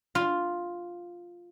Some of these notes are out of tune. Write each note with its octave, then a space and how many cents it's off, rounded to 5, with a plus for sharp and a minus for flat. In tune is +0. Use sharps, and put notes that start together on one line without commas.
F4 +5